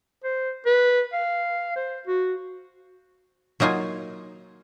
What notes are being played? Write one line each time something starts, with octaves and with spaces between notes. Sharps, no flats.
C5
B4
F5
C5
F#4
F#3 A#3 D#4 F4 G#5